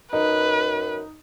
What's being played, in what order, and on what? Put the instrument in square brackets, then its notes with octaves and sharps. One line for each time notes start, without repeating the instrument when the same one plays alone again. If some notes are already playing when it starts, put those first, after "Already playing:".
[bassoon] F#2 [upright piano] D#4 [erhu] B4